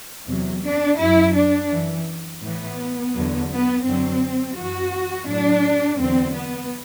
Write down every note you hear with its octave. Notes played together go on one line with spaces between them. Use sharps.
E2 C3 F#3
D4
F#2 F#3 E4
D4
F#2 E3
A2 E3 B3
E2 D3 F#3
B3
F#2 D3 F#3 C4
F#2 E3 F#4
A2 F#3 D4
E2 D3 F#3 C4
B3